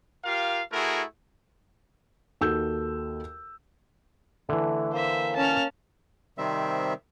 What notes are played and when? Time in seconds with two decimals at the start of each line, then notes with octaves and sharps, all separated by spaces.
0.25 F4 G4 A#4 F5
0.72 A3 E4 F#4 G#4 A#4
2.41 D#2 F#4 A4 E6 G6
4.49 D3 E3 A3
4.93 A#3 C5 E5
5.37 C#4 A5 F6
6.38 C3 D#3 G3 C4 E5